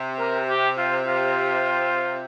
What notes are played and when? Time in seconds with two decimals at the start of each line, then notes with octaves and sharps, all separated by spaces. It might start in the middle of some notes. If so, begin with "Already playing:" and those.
Already playing: C3
0.20 A#4
0.49 G4
0.78 F4
1.07 F4